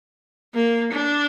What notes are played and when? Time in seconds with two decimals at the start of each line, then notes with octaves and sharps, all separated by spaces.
0.55 A#3
0.93 D4